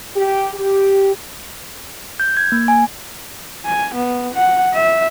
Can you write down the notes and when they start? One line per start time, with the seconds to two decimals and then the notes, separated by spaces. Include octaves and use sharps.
0.15 G4
0.54 G4
2.20 G6
2.37 G#6
2.52 A#3
2.68 G#5
3.65 G#5
3.94 B3
4.34 F#5
4.74 E5